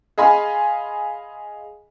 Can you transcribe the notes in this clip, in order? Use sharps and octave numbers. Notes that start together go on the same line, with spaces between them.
G#4 D#5 F5 G#5 B5 C6